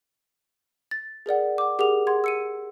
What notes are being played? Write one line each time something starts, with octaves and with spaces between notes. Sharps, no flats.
A6
G#4 A#4 D5 F#5
F#5 D6
G4 G#4 A#4 F#5 D6 F7
G#4 F#5 C6 G#6
E6 C#7 D#7